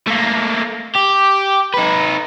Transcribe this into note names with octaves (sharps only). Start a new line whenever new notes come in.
A3 A#3
G4
D#4 B4